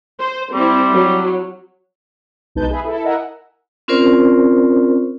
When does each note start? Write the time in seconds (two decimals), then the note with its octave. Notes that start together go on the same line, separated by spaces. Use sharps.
0.19 C5
0.54 G3 C4 E4
0.92 F#3
2.55 B1 G#3 D#4 B4 A5 G6
2.70 G#4 B4 E5
2.85 E4 A4
3.04 E4 A#4 D#5 E5 F#5 G#5
3.88 C4 C#4 F4 A#4 C5 D5